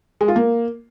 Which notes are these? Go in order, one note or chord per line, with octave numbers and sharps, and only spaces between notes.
G#3
F4
A#3